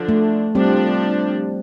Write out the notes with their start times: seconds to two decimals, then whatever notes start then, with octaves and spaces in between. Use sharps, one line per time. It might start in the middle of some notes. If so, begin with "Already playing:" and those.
Already playing: D3 F3 D4
0.09 A3
0.55 F3 G3 C4 D4 G4